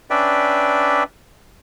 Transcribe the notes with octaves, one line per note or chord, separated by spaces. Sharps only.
C#4 D4 B4 D5 E5 G5